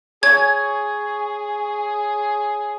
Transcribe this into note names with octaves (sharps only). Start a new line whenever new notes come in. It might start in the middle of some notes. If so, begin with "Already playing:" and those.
G#4 C#5 G#5 G#6